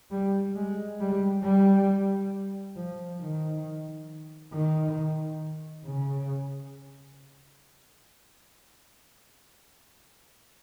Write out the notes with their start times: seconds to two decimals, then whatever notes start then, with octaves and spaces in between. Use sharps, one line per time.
0.11 G3
0.55 G#3
1.00 G3
1.43 G3
2.76 F3
3.21 D#3
4.52 D#3
5.86 C#3